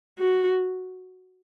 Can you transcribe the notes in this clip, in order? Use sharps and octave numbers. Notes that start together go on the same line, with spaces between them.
F#4